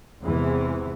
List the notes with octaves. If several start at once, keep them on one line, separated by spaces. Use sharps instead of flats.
E2 G#2 C3 E3